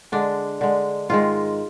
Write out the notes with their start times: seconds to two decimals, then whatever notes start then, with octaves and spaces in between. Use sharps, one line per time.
0.12 D3 G#3 D4
0.61 D3 G#3
1.09 G#2 D#3 G#3 F4